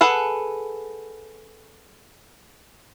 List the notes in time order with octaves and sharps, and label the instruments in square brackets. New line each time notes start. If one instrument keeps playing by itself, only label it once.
[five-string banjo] G#4 A4 B4 F#5